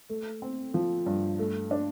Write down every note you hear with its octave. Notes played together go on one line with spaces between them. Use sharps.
A3
C4
F3
G2
A3
D4